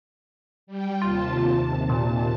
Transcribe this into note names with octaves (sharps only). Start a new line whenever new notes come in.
G3 G5
D#2 C3 F4 A5
A#2